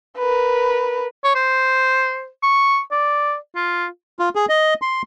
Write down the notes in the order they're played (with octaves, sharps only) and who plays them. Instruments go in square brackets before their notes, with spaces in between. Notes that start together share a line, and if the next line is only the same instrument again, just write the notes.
[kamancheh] A#4 B4
[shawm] C#5
C5
C#6
D5
F4
[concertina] F4
G#4
D#5
C6